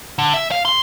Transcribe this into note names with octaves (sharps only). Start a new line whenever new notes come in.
D3
E5
F5
C6